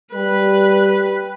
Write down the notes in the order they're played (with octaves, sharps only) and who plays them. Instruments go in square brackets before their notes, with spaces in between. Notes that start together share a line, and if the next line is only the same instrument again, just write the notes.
[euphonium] G3 [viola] B4